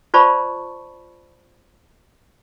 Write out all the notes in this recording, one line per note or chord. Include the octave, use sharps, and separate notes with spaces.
F4 C5 D5 A5 B5 C#6